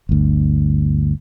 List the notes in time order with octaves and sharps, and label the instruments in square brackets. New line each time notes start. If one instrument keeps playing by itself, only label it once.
[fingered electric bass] G1 D2